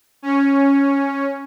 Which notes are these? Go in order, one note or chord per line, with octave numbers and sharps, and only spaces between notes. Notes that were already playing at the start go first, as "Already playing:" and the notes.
C#4